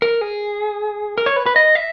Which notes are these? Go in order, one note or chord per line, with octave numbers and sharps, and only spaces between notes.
A#4
G#4
A#4
C#5
B4
B4
D#5
E5